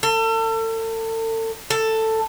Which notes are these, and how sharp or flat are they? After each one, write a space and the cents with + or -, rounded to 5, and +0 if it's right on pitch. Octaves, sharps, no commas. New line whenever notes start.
A4 +35
A4 +10